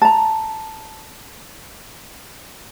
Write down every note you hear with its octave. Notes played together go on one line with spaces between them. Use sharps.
A5 A#5